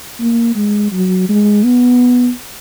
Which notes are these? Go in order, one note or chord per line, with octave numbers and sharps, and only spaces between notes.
A#3
G#3
F#3
G#3
B3